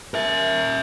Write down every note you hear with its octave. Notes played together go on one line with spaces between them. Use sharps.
A#4 E5